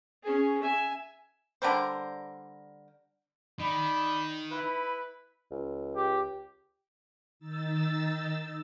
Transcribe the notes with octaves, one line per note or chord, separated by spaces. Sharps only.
C#4 G#4
E5 G#5
D3 G3 A#4 C5
D#3 D5 B5
E4 B4
C#2
G4
D#3 D#4 E6 A6